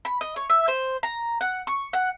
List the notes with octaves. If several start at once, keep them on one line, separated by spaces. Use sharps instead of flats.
B5
D#5
C#5
E5
C5
A#5
F#5
C#6
F#5